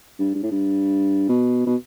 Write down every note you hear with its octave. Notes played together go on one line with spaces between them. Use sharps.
G2
G2
A2
G2
B2
B2